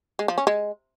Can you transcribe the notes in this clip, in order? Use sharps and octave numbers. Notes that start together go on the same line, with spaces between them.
G#3
F3
C#4
G#3